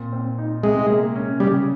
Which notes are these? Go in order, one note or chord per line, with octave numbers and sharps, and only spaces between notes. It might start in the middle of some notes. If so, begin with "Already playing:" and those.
Already playing: A#2 C4
C4
D#4
C3 G#3
A#3
C#4
C#3 G3